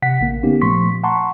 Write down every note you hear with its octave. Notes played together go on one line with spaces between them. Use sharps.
C3 F#5 B6
A1 D3 A#3
A#3 B3 C#4 D#4 G4
A#2 F3 A3 C6 C#6 B6
F#5 A5 A#5 C6 C#6